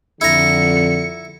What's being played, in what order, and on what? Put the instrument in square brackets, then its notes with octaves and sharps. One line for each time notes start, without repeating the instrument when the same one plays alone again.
[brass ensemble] F2 D3 [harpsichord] E4 A#5 [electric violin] C#7